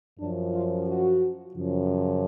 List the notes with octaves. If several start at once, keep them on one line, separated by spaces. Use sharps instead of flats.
F#2 F3 D4
F4
F#4
F#2 C#3 F3